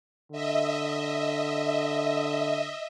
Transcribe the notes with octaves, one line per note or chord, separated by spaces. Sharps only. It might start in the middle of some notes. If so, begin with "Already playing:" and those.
D3 D#5 E5